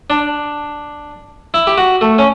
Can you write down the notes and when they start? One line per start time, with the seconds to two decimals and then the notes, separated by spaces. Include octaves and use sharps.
0.10 D4
1.54 E4
1.67 G4
1.77 F#4
2.01 A3
2.18 C#4